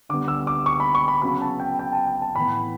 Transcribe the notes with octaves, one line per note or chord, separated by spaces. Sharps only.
D3 G3 B3 D6
E6
D6
C#6
B5
C#6
B5
C#3 F#3 B3 B5
A5
G5
G5
A5
G5
A5
A2 E3 B3 B5